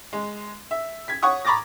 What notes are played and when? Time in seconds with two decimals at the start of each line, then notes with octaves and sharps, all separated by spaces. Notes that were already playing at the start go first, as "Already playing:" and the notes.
0.13 G#3
0.71 E5
1.08 G#6 B6
1.22 C#5 F#5 C#6 D#6
1.45 A#5 B5 C#6 D6 A6 A#6